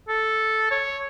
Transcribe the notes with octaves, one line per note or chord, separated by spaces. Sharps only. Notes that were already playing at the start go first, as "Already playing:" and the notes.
A4
C#5